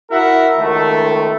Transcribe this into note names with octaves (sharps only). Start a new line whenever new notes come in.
E4 F#4 A#4 E5 F#5
C#2 D#3 A3